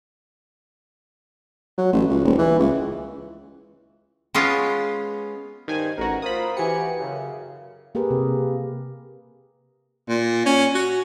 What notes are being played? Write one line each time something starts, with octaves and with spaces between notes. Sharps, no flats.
F#3
A1
C#2
D#1
E3
C#2
G#3 B3 C#4 F4
G2 D#3 C5 G#5
A1 F#4 A#4 A#5
F4 A#4 C5 B5 D#6
E3 F#4 G4 G#5 C#7
F#2 C#3
A#3 G4 G#4 A#4 B4
C3
A#2
C#4
F#4